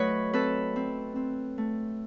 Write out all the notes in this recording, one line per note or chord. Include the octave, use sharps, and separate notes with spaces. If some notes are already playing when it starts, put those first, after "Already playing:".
Already playing: F#3 A3 B4 C#5 D#5
C4 A4 B4
C4
C4
A3